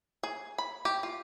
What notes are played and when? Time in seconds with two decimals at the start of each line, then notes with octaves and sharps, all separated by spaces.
0.23 G#4
0.58 B5
0.85 G4
1.03 F4